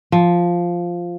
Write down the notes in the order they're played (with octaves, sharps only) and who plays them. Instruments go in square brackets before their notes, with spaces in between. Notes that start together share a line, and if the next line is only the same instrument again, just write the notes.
[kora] F3